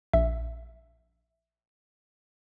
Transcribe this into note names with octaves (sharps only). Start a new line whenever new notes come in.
A#1 E5